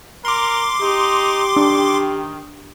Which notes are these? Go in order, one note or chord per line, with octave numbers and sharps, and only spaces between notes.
A#4 C6 D6
D#4 G4
D#3 D4